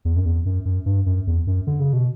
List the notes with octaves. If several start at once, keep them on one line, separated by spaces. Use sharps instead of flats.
E2
F#2
E2
F#2
F#2
G2
F#2
E2
F#2
D3
C#3
B2